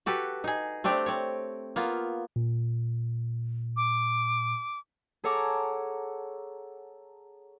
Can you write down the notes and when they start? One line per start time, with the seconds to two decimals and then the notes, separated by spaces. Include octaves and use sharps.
0.06 F#4 G4 A4 B4
0.44 D#4 G#4
0.84 A3 C4 D4 G4
1.06 C4 C#5
1.76 A#3 B3 F4
2.36 A#2
3.77 D6
5.24 G#4 A4 C#5 F#5 A#5 D6